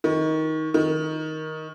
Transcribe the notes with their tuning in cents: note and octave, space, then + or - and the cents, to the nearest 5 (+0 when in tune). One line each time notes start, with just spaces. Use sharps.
D#3 +20
D#3 +10